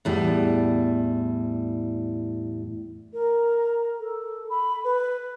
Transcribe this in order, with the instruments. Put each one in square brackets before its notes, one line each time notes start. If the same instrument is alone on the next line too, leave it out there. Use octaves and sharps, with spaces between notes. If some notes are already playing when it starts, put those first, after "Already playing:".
[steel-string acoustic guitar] E2 A2 G3
[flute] A#4
A4
B5
B4